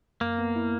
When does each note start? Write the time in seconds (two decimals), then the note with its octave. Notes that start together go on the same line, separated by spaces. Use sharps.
0.21 F#2 A#3
0.38 B3
0.56 E4